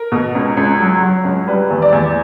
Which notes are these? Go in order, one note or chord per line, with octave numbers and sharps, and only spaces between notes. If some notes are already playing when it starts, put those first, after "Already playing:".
Already playing: A#4
B2
C#2
C#2
F#3
F#3
C#2
G3 B4
E2
D5
E2